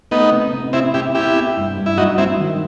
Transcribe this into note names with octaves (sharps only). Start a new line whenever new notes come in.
A3 B3 D#4
C3
C3
C3 C4 E4
C3 E4 G4
C3 E4 G4
B3
G2
G2
E4
F#3 D#4 F#4
F#3 C4 E4
D#3